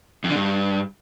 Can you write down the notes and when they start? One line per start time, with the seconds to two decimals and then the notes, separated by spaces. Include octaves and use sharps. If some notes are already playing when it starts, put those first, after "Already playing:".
0.24 F2
0.30 D3
0.35 G2